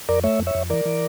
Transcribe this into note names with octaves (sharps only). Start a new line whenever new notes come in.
F2 A#4 D5
A3 C#5 E5
F2
C#5 E5
F2
E3 A#4 D5
E3